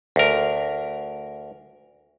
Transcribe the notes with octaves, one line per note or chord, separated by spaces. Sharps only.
D2 A#4